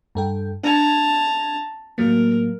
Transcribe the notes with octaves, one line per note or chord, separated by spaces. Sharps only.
G2 A4 G5
D4 A5 A#5 G#6
A2 F#3 A#3 A#4